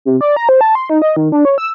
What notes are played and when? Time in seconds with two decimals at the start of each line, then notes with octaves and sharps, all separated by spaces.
0.05 C3
0.21 D5
0.36 A#5
0.49 C5
0.61 A5
0.75 C6
0.90 D#4
1.02 D#5
1.16 D#3
1.32 D4
1.45 C#5
1.58 E6